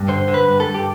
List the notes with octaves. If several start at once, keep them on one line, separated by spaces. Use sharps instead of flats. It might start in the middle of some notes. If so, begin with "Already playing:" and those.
Already playing: G2
D3 C5
D3
B4
G2
A4
G2
G4